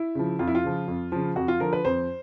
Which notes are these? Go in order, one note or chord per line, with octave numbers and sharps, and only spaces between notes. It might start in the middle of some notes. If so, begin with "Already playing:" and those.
Already playing: E4
C#3 F3
F2 F4
E4
F4
C#3 F3
F2
C#3 F3
F2 F#4
F4
D3 F3 A#4
B4
F2 C5